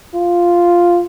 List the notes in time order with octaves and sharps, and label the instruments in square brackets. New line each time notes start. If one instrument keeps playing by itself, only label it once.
[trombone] F4